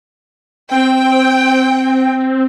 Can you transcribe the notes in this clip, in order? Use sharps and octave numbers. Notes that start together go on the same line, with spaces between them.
C4 G5